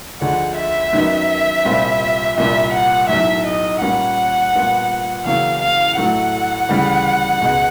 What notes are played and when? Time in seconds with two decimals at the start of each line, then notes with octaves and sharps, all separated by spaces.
0.21 D2 D3 F3 G#3 F#5
0.57 E5
0.93 F#2 D#3 F#3 B3 D#4
1.65 C2 A#2 G3 C4 F4
2.37 C2 A#2 G3 A#3 D4 E5
2.74 F#5
3.09 B1 A2 F#3 E5
3.46 D#5
3.81 A#2 G3 A#3 C#4 F#5
4.53 A#2 G3 B3 D4 F4
5.25 E2 C#3 F#3 A#3 C#4 F5
5.61 F5
5.97 A2 F#3 A3 F#5
6.69 D2 C#3 E3 G3
7.41 C#2 B2 G#3